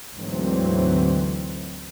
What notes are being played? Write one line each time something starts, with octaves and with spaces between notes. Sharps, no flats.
D2 G#2 D3 E3 F#3 C4